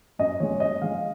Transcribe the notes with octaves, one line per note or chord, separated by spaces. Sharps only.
F#2 D#5
F3 G#3 C#5
F#2 D#5
F3 G#3 F5